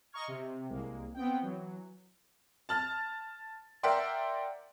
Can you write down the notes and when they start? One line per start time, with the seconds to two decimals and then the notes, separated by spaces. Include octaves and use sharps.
0.12 D#5 A#5 C#6 F6 G#6
0.28 C3
0.70 C2 G#3 A#3
1.14 B3 C4 G5
1.41 E3 F#3
2.69 A5 F6 A6
3.83 A#4 D5 E5 F#5 G5 C6